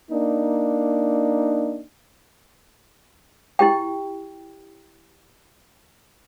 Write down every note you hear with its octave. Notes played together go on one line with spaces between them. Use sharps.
A#3 D4 D#4
E4 G4 G5